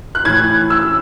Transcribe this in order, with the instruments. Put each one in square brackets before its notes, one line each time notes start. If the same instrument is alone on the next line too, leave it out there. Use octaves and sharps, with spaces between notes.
[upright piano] F#6
A2 E3 G#6
E6